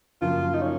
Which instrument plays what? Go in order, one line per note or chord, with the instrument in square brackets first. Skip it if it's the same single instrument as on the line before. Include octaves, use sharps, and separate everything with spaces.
[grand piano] F#2 C#3 F3 A#3 [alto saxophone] F4
[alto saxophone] D#4
C#4